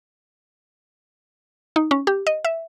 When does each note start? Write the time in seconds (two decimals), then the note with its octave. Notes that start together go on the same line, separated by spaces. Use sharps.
1.76 D#4
1.91 C#4
2.07 G4
2.27 D#5
2.45 E5